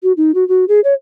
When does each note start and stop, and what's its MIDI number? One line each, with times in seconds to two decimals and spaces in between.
0.03 0.12 66
0.17 0.31 63
0.35 0.47 66
0.48 0.65 66
0.68 0.80 68
0.84 0.94 73